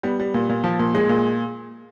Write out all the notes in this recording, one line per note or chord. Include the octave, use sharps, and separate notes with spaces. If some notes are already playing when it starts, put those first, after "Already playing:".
G3 B3
G3
A#2
A#2
F3
A#2
G#3
A#2